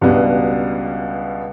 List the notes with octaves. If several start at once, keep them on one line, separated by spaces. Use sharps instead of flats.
C#2 B2 G3 B3 D4